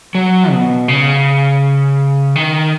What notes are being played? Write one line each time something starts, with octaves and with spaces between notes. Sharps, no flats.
F#3
B2
C#3
D#3